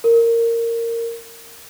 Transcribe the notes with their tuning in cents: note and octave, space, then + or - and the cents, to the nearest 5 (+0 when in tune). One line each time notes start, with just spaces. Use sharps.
A#4 -15